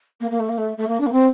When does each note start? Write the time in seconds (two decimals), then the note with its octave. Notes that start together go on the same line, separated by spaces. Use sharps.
0.20 A#3
0.30 A#3
0.40 A3
0.49 A#3
0.57 A3
0.77 A3
0.87 A#3
1.00 D4
1.06 A#3
1.12 C4